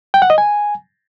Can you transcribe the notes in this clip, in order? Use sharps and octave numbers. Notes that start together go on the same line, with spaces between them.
G5
F#5
D#5
G#5